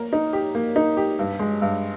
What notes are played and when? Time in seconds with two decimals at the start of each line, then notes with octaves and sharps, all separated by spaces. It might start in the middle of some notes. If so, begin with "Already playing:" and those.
Already playing: A#3 A#4
0.13 D#4
0.33 G4
0.55 A#3
0.76 D#4
0.97 G4
1.19 G2
1.39 G#3
1.62 G2